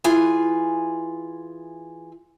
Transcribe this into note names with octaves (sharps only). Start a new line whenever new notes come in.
E3 F4 G#4 G#5